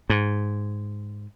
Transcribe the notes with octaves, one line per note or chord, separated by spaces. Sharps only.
G#2